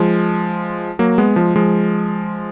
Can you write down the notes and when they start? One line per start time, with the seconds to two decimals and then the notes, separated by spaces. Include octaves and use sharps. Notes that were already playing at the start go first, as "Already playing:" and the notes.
Already playing: F3 G#3
0.99 F#3 A#3
1.18 G#3 B3
1.36 F3 G#3
1.56 F3 G#3